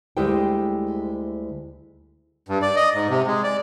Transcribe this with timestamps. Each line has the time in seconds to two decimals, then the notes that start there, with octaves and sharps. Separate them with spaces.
0.17 D2 G3 G#3 E4 C5 G5
2.49 G2
2.62 D5
2.76 D#5
2.95 G#2
3.10 C3
3.27 G#3
3.43 D5